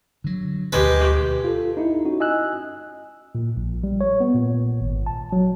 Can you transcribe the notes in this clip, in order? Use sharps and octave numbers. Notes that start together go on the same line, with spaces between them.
D3 F#3
D2 B2 D3 G#3 G4 B4
F4 A4
D#4 E4
C#4 D#4 F#4
D#5 G#5 E6 F#6
A#2
A#1
G3
C#5
B3
A#2
G#1
A5
F#3